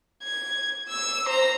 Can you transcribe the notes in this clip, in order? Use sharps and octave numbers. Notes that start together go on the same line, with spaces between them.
G#6
E6
C5 A#5